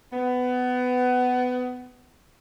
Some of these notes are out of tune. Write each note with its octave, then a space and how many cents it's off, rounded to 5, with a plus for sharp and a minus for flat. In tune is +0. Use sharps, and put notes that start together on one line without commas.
B3 +20